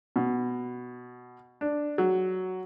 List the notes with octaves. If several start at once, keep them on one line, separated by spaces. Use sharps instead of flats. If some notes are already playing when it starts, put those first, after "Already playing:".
B2
D4
F#3